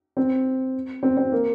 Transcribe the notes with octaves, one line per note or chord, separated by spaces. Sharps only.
C4
C4
C4
A#3